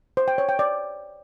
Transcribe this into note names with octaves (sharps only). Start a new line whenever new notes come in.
C5
G5
C#5
G5
D5